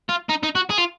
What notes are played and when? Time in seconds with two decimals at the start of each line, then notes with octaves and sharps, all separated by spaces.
0.09 F4
0.29 D#4
0.43 D#4
0.55 F#4
0.70 G#4
0.78 F4